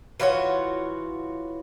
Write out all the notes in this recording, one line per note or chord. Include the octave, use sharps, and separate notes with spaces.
E3 F4 F#4 C#5